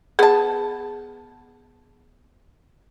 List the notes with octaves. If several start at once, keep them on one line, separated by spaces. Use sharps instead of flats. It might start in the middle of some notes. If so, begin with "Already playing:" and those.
B3 G#4 A5